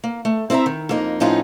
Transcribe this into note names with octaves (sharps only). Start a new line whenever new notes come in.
A#3
A3
C4 E4 C#5 E5 A#5
D#3
F2 A#3 D#4
A2 F3 B3 C#4 D#4 F4